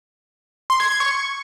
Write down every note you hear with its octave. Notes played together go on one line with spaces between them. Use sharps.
C6
G#6
G#6
C#6